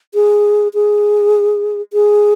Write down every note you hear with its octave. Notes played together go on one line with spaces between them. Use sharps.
G#4
G#4
G#4